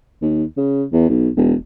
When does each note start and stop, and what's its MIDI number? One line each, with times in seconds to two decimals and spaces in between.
0.22 0.44 39
0.57 0.84 49
0.93 1.08 40
1.09 1.29 35
1.37 1.54 28